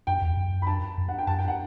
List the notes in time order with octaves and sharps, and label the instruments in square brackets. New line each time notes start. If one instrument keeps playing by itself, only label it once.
[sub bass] F#2 [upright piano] G5
[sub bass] E2
F#2
[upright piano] B5
A5
[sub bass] F#2
[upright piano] F#5
G5
[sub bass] F#2 [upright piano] A5
[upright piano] G5
F#5